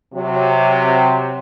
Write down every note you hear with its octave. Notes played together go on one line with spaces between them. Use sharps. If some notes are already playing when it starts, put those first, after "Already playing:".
C3 F#3